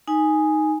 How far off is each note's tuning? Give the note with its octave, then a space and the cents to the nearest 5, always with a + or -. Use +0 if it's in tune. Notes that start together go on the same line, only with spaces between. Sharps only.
D#4 +0 G#5 +0